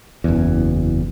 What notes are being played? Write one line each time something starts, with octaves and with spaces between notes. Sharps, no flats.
F#1 E2